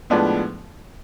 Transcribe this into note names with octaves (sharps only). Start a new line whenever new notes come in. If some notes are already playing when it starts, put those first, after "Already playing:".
A2 F3 G#3 B3 D4